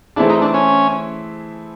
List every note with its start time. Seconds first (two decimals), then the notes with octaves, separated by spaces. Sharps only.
0.17 E3 A3 C4 D4 E4 G#4
0.30 D#4
0.42 D4
0.54 C#4